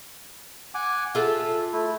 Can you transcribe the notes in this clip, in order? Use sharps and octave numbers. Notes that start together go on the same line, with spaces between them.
F#5 G#5 D6
F4 G#4 A4 E5
A3 E4